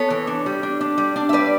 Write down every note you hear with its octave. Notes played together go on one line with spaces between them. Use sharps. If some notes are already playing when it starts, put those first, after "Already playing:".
Already playing: B3 A4 C#5
E3
D4
G3
D4
D4
G3
D4
E5
G3 B4 D5